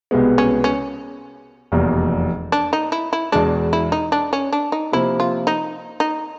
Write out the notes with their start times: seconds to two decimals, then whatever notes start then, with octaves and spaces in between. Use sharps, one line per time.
0.11 C2 B2 G#3 B3
0.38 C#4
0.64 C#4
1.72 F1 E2 B2 G3 A#3
2.52 D4
2.73 D#4
2.92 E4
3.13 E4
3.32 E2 B2 G#3 D4
3.73 E4
3.92 D#4
4.12 D4
4.33 C#4
4.52 D4
4.72 D#4
4.92 C3 F3 A#3 E4
5.20 F4
5.47 D#4
6.00 D#4